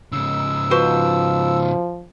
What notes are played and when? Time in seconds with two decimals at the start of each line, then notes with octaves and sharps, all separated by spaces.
0.12 G#2 C#3 E6
0.71 F3 F#4 B4 C5